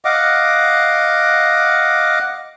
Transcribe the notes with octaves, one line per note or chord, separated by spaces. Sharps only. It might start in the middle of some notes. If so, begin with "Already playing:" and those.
D#5 F5 F#5 D6